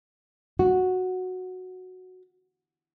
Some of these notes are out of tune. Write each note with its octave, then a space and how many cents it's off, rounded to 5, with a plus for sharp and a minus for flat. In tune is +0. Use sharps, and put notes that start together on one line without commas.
F#4 -5